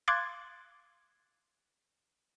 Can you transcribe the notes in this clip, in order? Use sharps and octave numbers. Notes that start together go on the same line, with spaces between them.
F5 C6 D6 F#6 G#6 A6